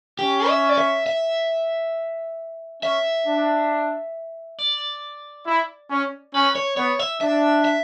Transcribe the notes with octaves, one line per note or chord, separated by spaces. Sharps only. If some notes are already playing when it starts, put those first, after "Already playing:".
C#4 G4
E5
D5
E5
E5
C#4 E5
D4
D5
E4
C#4
C#4 B4
C#5
B3 C#5
E5
D4 E5
E5